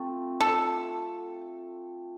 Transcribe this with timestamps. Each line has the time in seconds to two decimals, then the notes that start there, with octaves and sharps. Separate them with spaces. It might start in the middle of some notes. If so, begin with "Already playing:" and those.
Already playing: A3 C4 F4
0.41 A4